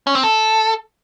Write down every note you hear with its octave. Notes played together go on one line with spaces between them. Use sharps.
C#4
C4
A4